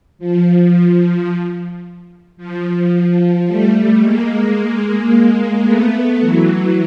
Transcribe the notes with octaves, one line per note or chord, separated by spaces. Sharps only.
F3
F3
G3 A3
G#3 A#3
A3 B3
E3 F#3